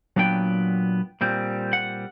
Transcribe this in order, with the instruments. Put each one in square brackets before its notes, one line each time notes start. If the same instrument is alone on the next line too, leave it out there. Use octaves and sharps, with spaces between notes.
[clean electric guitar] A#2 F#3 B3 D4 G5
A#2 G3 C4
F#5